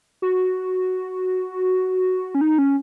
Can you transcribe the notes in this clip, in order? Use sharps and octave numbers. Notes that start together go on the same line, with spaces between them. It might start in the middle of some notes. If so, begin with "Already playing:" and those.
F#4
C#4
D#4
C#4